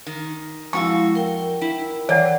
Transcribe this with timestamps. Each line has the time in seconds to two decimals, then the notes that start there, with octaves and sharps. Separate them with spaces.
0.07 D#3
0.73 F2 G#3 E4 F#4 F5 C#6
1.15 A#4 G5
1.61 E4
2.09 E3 C#5 D5 F#5